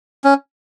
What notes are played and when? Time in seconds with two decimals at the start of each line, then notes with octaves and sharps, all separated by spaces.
0.24 C#4